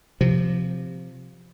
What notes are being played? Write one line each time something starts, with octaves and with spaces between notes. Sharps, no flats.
C3 F3